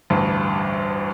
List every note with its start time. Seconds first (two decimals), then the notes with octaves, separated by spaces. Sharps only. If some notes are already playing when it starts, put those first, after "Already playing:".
0.10 A1 D2 G2